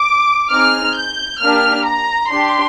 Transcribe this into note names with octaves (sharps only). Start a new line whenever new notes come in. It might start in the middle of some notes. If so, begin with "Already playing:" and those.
Already playing: D6
C4 D#4 G#4 F6
G6
A#3 D4 G4 F6
A#5
D4 G4 C6